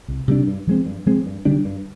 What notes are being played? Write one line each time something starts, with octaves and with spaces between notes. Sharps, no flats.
C2
C3 G3 D4
G2
F3 G#3 C4
G2
F3 G#3 C4
G2
D3 G3 D4
G2